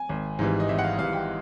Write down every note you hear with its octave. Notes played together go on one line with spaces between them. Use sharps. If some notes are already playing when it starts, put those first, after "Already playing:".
Already playing: G#5
G#1
G#2 E3 G3
D#5
G#1 E5
F#5
F5
G#2 E3 G3 F5
G5